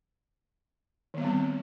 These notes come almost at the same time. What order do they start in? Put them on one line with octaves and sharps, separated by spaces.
D#3 B3 G3 C4